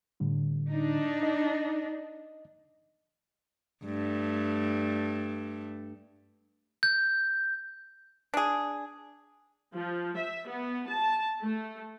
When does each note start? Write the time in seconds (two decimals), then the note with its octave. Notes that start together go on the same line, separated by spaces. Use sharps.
0.20 A2 D3 G3
0.70 D4 D#4
1.23 D#5
3.85 G2 A3
6.83 G6
8.34 D4 G#4
9.74 F3
10.16 E5
10.48 B3
10.87 A5
11.40 A3